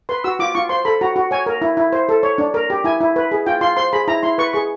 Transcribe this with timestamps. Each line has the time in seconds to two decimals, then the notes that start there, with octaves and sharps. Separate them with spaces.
0.09 B4 C6
0.24 F#4 E6
0.39 F4 D6
0.55 F4 C#6
0.69 C5 C6
0.85 A4 B5
1.01 F#4 A#5
1.16 F#4
1.31 C#5 G#5
1.46 A#4
1.62 E4
1.77 E4
1.93 C5
2.09 A4
2.23 C#5
2.38 D4
2.54 A#4
2.70 G4
2.84 E4 G#5
3.01 E4
3.16 B4
3.31 G#4
3.46 F4 G5
3.61 F4 C6
3.77 C5 C6
3.93 G#4 B5
4.08 E4 A#5
4.23 E4 C6
4.38 B4 C#6
4.53 G#4 C#6